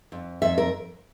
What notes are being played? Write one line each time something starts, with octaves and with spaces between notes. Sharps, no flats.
F2
F2 E5
A#4